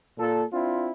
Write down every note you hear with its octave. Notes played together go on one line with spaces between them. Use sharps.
A#2 A4
C4 D4 E4 F4